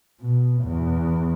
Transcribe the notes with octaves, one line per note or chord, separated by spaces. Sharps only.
B2
E2